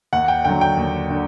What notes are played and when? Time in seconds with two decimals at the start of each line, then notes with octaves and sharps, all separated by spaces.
0.13 D#2 F#5
0.28 G5
0.45 D3 F#3 G5
0.61 G5
0.77 D#2
1.10 D3